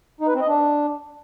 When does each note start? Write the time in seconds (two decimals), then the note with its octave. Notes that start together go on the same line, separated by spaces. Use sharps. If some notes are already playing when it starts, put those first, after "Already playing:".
0.21 D#4
0.27 B4
0.34 C4
0.41 D#5
0.48 D4